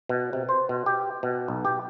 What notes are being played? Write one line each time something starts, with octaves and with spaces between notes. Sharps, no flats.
B2
C3
C5
B2
G4
B2
B1
G4